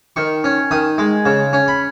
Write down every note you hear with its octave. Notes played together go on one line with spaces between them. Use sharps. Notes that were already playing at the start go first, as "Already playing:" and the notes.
D#3 C#6
C#4
D#3 D#6
G#3
C#3
C#4
B5